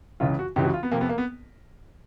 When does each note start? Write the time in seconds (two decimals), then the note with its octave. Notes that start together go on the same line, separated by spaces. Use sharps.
0.20 C#2 C#3 E3 F4
0.39 F#4
0.56 C#2 C#3 E3 G4
0.64 F#4
0.74 F4
0.83 B3
0.91 F2 C3 F3 A#3
1.01 B3
1.09 A#3
1.18 B3